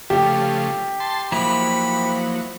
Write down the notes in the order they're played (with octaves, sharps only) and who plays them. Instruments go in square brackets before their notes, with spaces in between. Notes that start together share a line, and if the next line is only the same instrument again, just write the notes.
[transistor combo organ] C#3 F3 A3 [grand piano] G4
[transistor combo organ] A5 C6
[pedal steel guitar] F3 A#3 E4 [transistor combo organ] F#3 [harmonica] B5